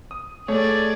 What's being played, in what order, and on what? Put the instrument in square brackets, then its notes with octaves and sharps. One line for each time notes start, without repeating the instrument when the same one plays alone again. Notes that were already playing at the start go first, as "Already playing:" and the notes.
[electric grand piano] D#6
[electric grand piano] A3 C#5 [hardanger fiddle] G#4 D5